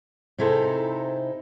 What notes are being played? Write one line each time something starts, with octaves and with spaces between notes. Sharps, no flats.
C3 D#4 E4 G#4 A4 C5